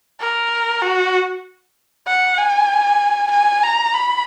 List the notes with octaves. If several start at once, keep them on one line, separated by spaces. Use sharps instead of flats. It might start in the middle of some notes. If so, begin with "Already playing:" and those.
A#4
F#4
F#5
G#5
G#5
A#5
B5